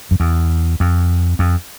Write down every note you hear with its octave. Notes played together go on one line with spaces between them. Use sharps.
F#2
E2
F2
F2